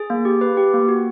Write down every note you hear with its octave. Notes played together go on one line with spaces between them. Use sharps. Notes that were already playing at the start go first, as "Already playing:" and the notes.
Already playing: G#4
A#3
G4
B4
G4
A#3
F#4